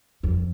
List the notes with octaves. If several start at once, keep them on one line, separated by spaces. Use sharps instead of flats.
F2